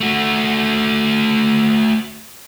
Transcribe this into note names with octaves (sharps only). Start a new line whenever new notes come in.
A3 F#4